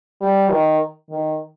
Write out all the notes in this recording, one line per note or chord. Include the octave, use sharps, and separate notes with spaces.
G3
D#3
D#3